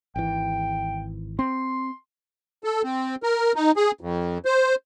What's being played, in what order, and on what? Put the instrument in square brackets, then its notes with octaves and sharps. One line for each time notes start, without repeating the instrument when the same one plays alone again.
[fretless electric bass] G#1 E3 [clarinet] G5
[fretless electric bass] C4 [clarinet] C6
[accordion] A4
C4
A#4
D#4
G#4
F2
C5